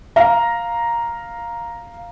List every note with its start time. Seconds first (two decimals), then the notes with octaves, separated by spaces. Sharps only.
0.16 F5 A#5